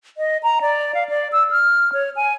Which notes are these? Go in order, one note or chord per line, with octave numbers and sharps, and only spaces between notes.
D#5
A#5
D5
F5
D5
E6
F6
C#5
G#5